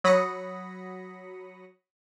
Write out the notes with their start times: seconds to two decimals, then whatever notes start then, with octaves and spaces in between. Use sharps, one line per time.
0.04 F#3 B5 D#6 A#6 C#7